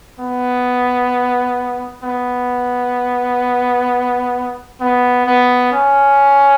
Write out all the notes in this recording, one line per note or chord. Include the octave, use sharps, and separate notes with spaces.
B3
B3
B3
B3
C#4